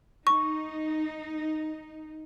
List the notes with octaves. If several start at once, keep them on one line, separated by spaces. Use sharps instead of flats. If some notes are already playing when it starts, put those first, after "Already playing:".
D#4 C#6